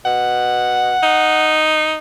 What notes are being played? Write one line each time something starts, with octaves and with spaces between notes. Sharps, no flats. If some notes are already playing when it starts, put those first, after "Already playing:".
B2 F#5
D#4